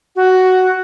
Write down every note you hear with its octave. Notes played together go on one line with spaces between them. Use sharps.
F#4